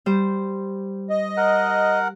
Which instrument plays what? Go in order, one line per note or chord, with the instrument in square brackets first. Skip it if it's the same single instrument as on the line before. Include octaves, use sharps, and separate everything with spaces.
[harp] G3 C5
[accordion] D#5
[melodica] A#4 F#5